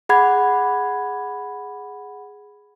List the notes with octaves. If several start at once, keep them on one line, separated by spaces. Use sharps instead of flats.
G#4 F#5 B5 G#6